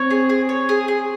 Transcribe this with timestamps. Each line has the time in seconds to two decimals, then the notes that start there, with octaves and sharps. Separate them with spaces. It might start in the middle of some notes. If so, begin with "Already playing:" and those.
Already playing: C4 C#5
0.11 G#4
0.29 G#4
0.49 C#5
0.69 G#4
0.88 G#4